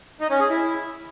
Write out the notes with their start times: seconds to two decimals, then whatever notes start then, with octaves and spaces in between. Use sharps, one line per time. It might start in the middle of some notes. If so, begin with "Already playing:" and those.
0.21 D#4
0.30 C#4
0.40 G#4
0.50 E4